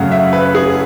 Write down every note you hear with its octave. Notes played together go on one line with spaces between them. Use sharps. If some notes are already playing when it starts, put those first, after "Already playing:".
Already playing: F#2 C#3 F#3 A3 F#5
E5
B4
G#4